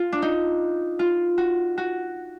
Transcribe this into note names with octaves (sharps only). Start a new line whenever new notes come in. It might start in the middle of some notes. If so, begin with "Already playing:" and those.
Already playing: F4
D4
D#4
F4
F#4
F#4